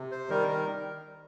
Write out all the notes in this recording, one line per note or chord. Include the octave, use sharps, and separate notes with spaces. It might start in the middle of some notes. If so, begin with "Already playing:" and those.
Already playing: C3
C5
D#3 G3 A#4
A#4